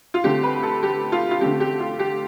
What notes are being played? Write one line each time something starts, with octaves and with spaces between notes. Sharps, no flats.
F4
D3 A3 C4 G4
B4
A4
G4
F4
F4
D3 A3 C4 G4
G4
F4
G4